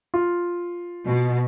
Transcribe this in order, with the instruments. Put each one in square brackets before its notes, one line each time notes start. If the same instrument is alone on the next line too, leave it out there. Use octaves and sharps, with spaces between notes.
[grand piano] F4
[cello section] B2